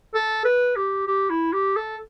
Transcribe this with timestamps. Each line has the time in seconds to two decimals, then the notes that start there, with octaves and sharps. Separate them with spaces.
0.15 A4
0.45 B4
0.76 G4
1.07 G4
1.30 E4
1.53 G4
1.76 A4